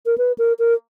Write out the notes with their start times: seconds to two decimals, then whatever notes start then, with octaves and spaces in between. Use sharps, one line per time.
0.06 A#4
0.18 B4
0.38 A#4
0.59 A#4